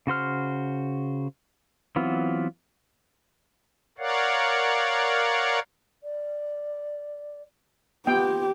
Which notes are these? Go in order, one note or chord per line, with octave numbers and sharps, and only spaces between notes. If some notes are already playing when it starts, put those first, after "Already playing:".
C#3 F#4 C5 F6
E3 F#3 B3 C4 F4
A#4 C#5 D5 F5 F#5
D5
B3 F4 G4 G5